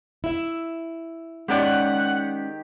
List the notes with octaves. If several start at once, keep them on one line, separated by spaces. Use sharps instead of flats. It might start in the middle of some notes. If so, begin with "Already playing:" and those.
E4 E5
D#3 G#3 C#4 G4 D5 F#5